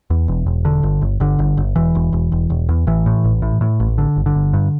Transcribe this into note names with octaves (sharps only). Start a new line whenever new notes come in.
E2
E1
E1
D3
G1
G1
G1 D3
G1
G1
E1 E3
E1
E1
E1
E1
E2
A1 E3
A2
A1
A2
A2
A1
D3
G1
D3
G1
G2